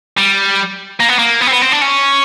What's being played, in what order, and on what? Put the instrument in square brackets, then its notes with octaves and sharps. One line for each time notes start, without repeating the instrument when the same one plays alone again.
[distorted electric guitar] G3
A#3
B3
A#3
B3
C4
B3
C4
D4
C#4